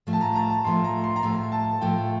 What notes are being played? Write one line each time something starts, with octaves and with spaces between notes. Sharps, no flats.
A2 F3 A3
A5
A#5
A#5
A5
A2 F3 A3 C6
A#5
C6
A#5
A2 F3 A3 C6
A5
A2 F3 A3 G5